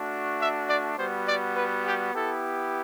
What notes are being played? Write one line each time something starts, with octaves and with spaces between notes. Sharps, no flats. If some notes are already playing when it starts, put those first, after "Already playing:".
Already playing: A3 D4 F#4
E5
D5
G3 B3 F#4 C5
D5
B4
G4
B3 E4 G4 A4